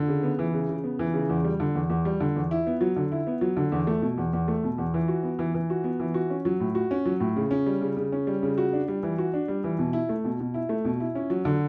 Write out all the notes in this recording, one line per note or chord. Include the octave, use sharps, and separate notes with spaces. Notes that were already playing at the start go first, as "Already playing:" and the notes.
Already playing: D3
C#3
B3
E3
C#3
C#3
B3
E3
C#3
E2
G3
D3
E2
E2
G3
D3
E2
E4
B3
F#3
D3
E4
B3
F#3
D3
E2
A3
B2
E2
E2
A3
B2
E2
E3
F#4
B3
E3
E3
F#4
B3
E3
F#4
C#4
F#3
A2
F#4
C#4
F#3
A2
C#3
C#4
G3
C#3
C#3
C#4
G3
C#3
F#4
D4
G3
E3
F#4
D4
G3
E3
B2
E4
A3
B2
B2
E4
A3
B2
E4
C#4
F#3
D3